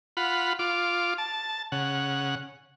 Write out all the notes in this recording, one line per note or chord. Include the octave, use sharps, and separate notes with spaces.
F4 F#5 B5
F4 D6
A5
C#3 F#5